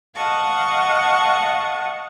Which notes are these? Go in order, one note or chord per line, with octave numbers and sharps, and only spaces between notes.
D#5 F5 F#5 A5 C#6